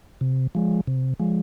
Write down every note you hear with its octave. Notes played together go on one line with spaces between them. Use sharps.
C3
F3 G#3
C3
F3 G#3